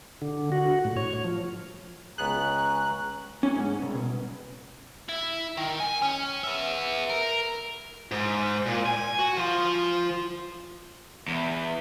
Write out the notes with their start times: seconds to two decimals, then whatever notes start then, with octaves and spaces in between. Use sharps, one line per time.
0.22 D3
0.52 F#4
0.85 A2
0.97 C#5
1.24 F3
2.18 C#2 B3 C#4 G#4 A#5 F#6
3.43 C#4
3.56 G#2
3.82 C2
3.95 B2
5.09 E4
5.57 D#3
5.80 G#5
6.02 C#4
6.44 B3 E5
7.09 A#4
8.12 G#2
8.66 A#2
8.86 G#5
9.19 F#4
9.37 F3 F4
11.28 E2